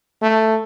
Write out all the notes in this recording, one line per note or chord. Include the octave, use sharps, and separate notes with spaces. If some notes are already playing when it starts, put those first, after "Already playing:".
A3